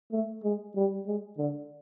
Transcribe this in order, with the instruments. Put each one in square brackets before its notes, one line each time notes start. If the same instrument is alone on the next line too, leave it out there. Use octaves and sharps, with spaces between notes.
[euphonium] A3
G#3
G3
G#3
D3